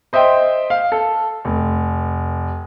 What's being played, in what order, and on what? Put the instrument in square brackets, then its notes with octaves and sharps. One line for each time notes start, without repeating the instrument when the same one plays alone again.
[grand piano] C5 D#5 E5 G5 C6
F5
A4
F1